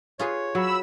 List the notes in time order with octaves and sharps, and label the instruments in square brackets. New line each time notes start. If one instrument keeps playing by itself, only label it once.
[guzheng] F4 G#4 B4 [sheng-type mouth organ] C#5
[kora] F#3 [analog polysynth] B5 E6